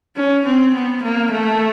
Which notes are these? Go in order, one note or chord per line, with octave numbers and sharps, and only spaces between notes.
C#4
C4
B3
A#3
A3